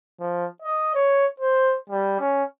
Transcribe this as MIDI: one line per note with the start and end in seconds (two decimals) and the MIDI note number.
0.20 0.46 53
0.62 0.93 75
0.95 1.26 73
1.40 1.77 72
1.90 2.19 55
2.20 2.43 61